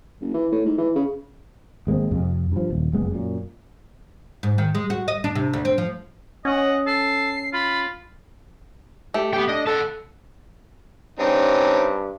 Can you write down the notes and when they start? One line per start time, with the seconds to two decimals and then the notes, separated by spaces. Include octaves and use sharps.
0.21 F#1
0.34 E3
0.52 A2
0.66 G#2
0.78 E3
0.96 C#3
1.87 G#1 G#3 A#3 C4
2.11 F2 C3
2.52 G2 F3
2.70 D#1
2.93 F#1 F2 G#3 B3
3.11 F#2 A#2
4.43 G#2
4.58 D#3
4.75 G#3
4.90 F#4
5.08 D#5
5.24 D4
5.35 C3
5.53 D2
5.65 C4
5.78 F3
6.45 C#4 D#5 F#5
6.87 A4 C7
7.53 F4 B5
9.14 A3 G4
9.33 B3 G4 G5
9.49 D4 D#5
9.67 A4 F#5 A5
11.19 G2 C4 C#4 D#4